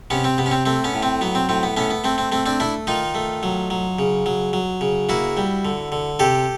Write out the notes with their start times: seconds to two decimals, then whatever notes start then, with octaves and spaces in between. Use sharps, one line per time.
0.10 C3 B3 C#4
0.24 C4
0.38 C3 B3
0.46 C#4
0.51 C4
0.66 A3 C4
0.84 B3 C#4
0.94 A2
1.03 C4
1.21 F#3 B3
1.35 C4
1.49 A2 C4
1.63 B3
1.77 A3 B3 C#4
1.90 B3
2.04 A3 C4
2.18 C4
2.32 A3 C4
2.46 C4 D4
2.60 A3 D4 E4
2.87 D#3 D#4 F4
3.15 A3
3.43 F#3
3.70 F#3
3.99 C#3
4.26 F#3
4.53 F#3
4.81 C#3
5.09 A#3 E4 F#4
5.37 G3
5.65 D3
5.92 D3
6.19 C3 G4 A4